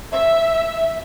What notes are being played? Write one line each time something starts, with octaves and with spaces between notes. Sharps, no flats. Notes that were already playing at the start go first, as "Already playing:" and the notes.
E5